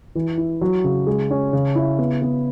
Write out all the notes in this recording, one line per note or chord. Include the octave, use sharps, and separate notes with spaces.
E3
E4
F#3
C#3
G#3
C#4
C#3
E4
B3
B3